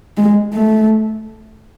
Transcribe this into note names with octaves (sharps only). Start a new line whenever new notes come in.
G#3
A3